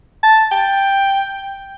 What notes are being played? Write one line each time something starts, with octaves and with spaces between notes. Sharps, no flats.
A5
G5